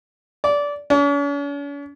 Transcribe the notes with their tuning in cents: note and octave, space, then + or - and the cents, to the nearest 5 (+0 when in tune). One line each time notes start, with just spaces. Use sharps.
D5 -20
C#4 +45